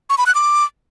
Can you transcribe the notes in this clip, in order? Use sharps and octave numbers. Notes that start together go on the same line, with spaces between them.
C#6
B5
F#6
D6